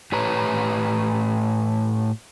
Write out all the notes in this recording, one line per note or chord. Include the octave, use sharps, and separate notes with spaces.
A2 G4 B4 C#5 A#5